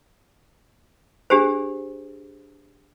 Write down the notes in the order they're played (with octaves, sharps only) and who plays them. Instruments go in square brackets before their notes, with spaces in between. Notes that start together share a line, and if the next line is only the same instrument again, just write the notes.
[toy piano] D4 G4 G#4 C5